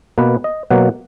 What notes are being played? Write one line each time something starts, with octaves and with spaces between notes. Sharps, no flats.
B2 A#3 B4
D#5
B2 F#3 A#3 F#5